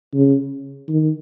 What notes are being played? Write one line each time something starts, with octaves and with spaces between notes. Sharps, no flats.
C#3
D#3